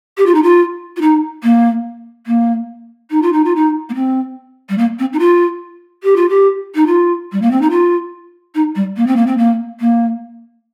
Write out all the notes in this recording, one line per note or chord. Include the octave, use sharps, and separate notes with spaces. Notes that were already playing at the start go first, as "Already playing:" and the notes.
G4
F4
D#4
F4
F4
D#4
A#3
A#3
D#4
F4
D#4
F4
D#4
A#3
C4
G3
A#3
C4
D#4
F4
G4
F4
G4
D#4
F4
G3
A#3
C4
D#4
F4
D#4
G3
A#3
C4
A#3
C4
A#3
A#3